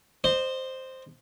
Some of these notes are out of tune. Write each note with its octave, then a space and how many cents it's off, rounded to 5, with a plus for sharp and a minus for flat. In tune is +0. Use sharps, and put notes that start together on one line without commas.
C5 +0 D#5 -30